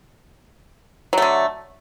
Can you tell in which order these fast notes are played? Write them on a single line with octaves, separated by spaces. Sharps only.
F#3 A3 D3